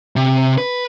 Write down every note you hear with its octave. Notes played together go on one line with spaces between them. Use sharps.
C3
B4